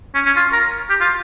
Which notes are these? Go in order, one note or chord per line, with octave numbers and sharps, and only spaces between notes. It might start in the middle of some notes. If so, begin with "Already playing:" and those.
C#4
C#4
F4
A#4
G4
F4